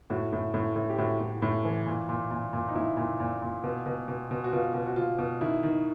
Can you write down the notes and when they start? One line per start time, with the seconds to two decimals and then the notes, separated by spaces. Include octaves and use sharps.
0.10 A2 F#4
0.32 A2
0.54 A2
0.76 A2
0.90 G4
0.98 A2 F#4
1.20 A2
1.42 A2
1.65 E3
1.86 A#2
2.09 A#2
2.31 A#2
2.53 A#2
2.68 D#4
2.75 A#2 E4
2.97 A#2
3.20 A#2
3.42 A#2
3.64 B2
3.86 B2
4.08 B2
4.31 B2
4.44 F#4
4.52 B2 F4
4.74 B2
4.86 F#4
4.96 B2 F4
5.18 B2
5.41 D#3 E4
5.63 D#3